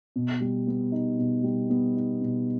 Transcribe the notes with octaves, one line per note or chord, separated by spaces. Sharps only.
B2
G3
B3
D#4
B2
G3
B3
D#4
B2